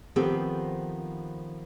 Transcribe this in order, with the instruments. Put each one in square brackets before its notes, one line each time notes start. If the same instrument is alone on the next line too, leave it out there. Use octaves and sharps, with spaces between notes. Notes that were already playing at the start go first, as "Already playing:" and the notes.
[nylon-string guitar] D#3 F3 B3 C4 G4 A4